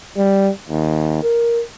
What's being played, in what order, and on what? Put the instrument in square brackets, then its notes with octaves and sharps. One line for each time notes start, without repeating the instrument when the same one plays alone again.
[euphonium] G3
D#2
A#4